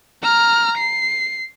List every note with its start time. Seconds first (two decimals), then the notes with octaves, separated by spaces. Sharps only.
0.23 A#5 F6
0.78 C7